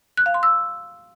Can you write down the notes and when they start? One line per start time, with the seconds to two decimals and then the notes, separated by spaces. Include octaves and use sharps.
0.17 F#6
0.26 F5
0.34 C6
0.43 E6